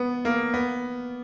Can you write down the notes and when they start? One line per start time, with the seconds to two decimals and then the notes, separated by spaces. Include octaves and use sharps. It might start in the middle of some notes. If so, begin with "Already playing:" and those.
Already playing: B3
0.25 A#3
0.54 B3